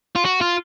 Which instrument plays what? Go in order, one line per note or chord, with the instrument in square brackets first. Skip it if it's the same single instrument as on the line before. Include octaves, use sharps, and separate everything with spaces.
[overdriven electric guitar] F4
F#4
F4